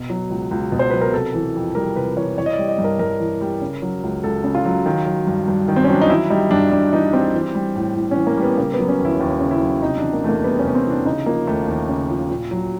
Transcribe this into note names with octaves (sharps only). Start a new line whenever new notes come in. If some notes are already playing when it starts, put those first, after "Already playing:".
Already playing: B2
F#3
C#2
C#2
B2
C5
F#3 B4
A#4
C3 A4
E3
F2
G3 A#4
C3 B4
E3 C#5
E3 C#5
D#5
G3 D5
D#5
G2
A#4
G2 A#4
E3
G3
C#3
F#3
C#2
C#2 A4
C#3
F4
F#3
D#3
F#3
G2
G2
D#3
C4
C#4
F#3 D4
D#4
E3 E4
G3 D#4
G2 D4
G2 D4
E3 D#4
G3 C4
E3
G3
A2
A2
C#4
E3
A#3
G3
B3
C#3 A#3
B3
F#3
C#4
D#2
E4
D#2
C#3
E4
F#3
C3 D#4
E3 D4
A#3
E2 A3 A#3
G3 B3
C#4
C3 B3
C4
E3
D4
C#3 D#4
F3 A#3
D#2 A3
D#2
C#3
F3
A#2
F#3